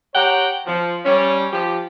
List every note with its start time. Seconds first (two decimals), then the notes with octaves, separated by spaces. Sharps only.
0.15 G4 C#5 F#5 G5 A#5
0.66 F3
1.05 G3 C#4
1.52 F3 G4